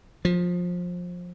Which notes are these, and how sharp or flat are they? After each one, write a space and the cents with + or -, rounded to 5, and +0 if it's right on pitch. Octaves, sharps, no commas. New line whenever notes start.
F3 +20